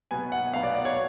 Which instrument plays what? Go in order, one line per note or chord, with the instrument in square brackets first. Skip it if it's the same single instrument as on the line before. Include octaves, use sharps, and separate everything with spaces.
[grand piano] B2 F#3 B3 G#5
F#5
B2 F#3 B3 F5
D5
D5
C#5